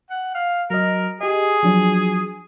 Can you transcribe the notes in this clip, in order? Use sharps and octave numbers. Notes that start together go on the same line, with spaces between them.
F#5
F5
F#3 A#4 D#5
G4 G#4 D#5
F3 F#3 D4